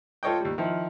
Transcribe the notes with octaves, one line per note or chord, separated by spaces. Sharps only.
F4 A4 C#5 D#5 G5
D#2 G3
D#3 F3 E4